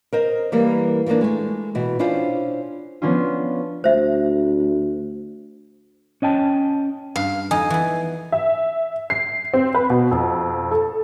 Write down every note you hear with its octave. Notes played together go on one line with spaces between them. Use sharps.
A#4 C5 D#5
E3 G3 A#3 A#4
E3 F3 G3 A#3 D4
G#3 A3
B2 E3
C#4 D4 E4 F4 C5
F3 B3 C#4 D4 F4
D2 C5 E5
C#4 D#5 G5 A5
G2 F5
F2 D#4 D#5 G#5
E3 B3
E5
C7
C4
B4
B2
F2
A4